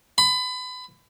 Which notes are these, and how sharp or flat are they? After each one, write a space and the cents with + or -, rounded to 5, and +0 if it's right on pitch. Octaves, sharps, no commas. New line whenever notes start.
B5 +30